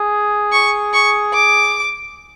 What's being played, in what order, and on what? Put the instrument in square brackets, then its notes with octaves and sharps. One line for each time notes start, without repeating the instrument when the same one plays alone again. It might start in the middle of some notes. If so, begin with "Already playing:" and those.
Already playing: [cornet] G#4
[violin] C#6
C#6
D6